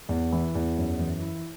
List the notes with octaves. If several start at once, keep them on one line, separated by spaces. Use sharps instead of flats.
E2
E3
E2
F#2
E3
E4